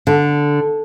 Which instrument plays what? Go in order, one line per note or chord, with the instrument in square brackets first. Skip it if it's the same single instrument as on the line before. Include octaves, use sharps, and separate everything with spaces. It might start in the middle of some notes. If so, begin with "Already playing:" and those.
[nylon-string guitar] D3